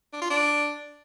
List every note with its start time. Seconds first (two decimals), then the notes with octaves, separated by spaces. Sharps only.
0.13 D4
0.22 F4
0.30 D4